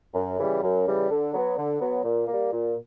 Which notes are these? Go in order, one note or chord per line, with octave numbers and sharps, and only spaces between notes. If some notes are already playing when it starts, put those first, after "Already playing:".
F#2
C#3 E3 G3
F#2
C#3 E3 G3
D3
F#3 B3
D3
F#3 B3
A#2
G3 A#3
A#2